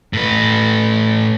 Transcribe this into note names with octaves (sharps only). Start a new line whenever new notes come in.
A2 B4